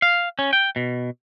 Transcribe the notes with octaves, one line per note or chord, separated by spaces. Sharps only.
F5
C#4
G5
B2